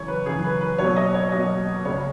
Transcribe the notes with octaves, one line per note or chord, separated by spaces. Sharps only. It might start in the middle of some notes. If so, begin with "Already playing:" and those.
Already playing: F#2 C#3 E3 C#5
B4
F#2 C#3 E3 G#4
B4
B4
B1 B2 F#3 A#3 C#5
D#5
C#5
B1 B2 F#3 A#3 D#5
C#2 C#3 G#3 C#5